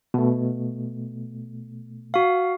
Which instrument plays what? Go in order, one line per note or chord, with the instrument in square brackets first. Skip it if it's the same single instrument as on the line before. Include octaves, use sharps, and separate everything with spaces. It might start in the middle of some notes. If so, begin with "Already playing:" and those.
[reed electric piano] B2 A3
[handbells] F#4 F5